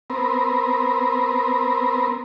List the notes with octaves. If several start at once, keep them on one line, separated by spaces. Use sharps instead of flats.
B3 C4 A#4